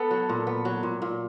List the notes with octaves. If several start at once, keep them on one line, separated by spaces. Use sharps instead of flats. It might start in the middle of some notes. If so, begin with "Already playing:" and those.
Already playing: B3 A4
F#3
A#2
B3
F#3
A#2
A#2